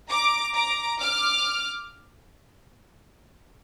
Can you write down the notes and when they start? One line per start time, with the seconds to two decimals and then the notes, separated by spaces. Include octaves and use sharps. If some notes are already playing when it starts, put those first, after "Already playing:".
0.10 A#5 D6
0.54 A#5 D6
0.99 D6 F6